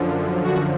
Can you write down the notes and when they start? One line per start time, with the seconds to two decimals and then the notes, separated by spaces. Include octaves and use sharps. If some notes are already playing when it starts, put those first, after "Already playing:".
Already playing: F#2 D3 F3
0.44 F#4